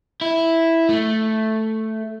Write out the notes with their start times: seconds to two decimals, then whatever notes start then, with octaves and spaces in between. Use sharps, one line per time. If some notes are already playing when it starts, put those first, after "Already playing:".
0.21 E4
0.89 A3